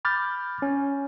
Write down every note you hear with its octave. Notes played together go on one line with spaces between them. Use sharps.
B5 D6 F6 G6 A6
C#4